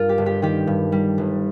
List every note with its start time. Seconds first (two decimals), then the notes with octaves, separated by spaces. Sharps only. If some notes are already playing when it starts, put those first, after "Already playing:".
Already playing: G2 F4 A#4
0.09 G4
0.18 G1
0.26 G4
0.42 D#3 G4
0.67 G2
0.92 G3
1.18 G1